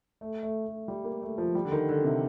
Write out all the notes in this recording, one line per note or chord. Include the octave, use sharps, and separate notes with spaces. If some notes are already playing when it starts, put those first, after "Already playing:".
A3
A3
A3
G3
A#3
A3
F3
G3
D3
D#3
D3
C3